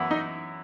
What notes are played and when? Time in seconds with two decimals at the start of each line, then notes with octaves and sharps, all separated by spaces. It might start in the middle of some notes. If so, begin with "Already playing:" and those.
Already playing: F#2 E3 B3 E4
0.11 D#4